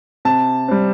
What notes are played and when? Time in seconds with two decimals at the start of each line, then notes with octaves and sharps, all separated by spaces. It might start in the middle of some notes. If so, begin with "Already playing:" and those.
0.25 C3 A5
0.68 G3 C4